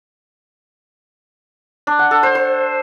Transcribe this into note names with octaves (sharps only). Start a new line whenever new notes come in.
D4
F#5
A4
C5
C5